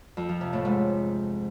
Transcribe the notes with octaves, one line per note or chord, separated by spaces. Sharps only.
F2
F3
C3
A2
G#2